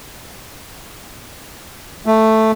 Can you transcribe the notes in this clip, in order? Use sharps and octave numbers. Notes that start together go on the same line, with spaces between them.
A3